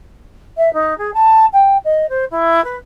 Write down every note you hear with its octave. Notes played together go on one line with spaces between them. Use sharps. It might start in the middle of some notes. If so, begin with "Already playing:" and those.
E5
D#4
G#4
A5
G5
D#5
C5
E4
B4